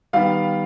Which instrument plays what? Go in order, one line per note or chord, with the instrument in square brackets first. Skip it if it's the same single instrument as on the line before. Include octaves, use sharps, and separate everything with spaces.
[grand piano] D#3 G3 B3 F5